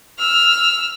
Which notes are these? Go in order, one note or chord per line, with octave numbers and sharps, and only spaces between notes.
E6 F6